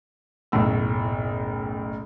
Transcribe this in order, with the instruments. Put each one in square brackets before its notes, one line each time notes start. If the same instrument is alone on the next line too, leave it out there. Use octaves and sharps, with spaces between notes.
[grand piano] F#1 B1 A2 E6